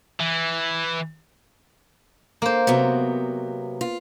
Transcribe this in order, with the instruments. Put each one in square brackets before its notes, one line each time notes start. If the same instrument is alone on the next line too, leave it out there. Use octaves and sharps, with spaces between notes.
[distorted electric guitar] E3
[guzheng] A#3 C5
[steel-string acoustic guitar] C3 F#3 B3
F4